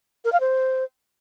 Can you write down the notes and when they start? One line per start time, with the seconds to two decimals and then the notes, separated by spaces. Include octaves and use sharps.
0.25 A#4
0.32 F5
0.40 C5